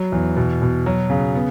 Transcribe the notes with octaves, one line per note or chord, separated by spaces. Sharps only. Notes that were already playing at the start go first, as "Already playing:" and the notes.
Already playing: F#3
E2
B2
B2
F#3
C#3
B3